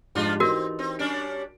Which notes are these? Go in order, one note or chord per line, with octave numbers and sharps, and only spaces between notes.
G#2 F3 G3 G#3 D4 F4
E3 C4 D#4 F#4 A#4
C4
G3 C#4 D4 D7